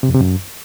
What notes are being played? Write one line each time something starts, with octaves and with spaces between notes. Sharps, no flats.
C3
F2
C3
F#2